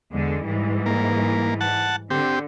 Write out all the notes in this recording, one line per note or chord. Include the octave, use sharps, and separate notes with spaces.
E2 D3 G#3
G#2 E3 G3
A#3
F#5 A5
D3 C4 G4